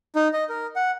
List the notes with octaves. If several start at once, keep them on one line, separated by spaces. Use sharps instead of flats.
D#4
D#5
A#4
F#5